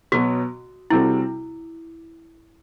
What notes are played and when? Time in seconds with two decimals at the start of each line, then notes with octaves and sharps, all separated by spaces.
0.12 B2 F#3 B3 F#4
0.90 C3 G3 C4 E4 F#4 A4